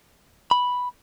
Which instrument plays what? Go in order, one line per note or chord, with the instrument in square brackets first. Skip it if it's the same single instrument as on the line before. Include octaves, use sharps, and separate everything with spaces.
[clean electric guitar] B5